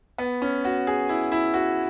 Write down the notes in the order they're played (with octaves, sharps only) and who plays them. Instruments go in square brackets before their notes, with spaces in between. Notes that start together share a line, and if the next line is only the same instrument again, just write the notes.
[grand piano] B3
C#4
F#4
G#4
E4
E4
F#4